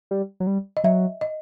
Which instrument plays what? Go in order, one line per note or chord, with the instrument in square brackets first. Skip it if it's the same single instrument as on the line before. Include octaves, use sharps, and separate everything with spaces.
[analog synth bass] G3
F#3
G3
[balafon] D#5
[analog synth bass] F#3 [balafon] E5
[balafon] D#5